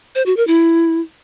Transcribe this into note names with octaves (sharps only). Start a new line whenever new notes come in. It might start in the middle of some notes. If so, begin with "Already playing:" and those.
C5
F#4
A#4
E4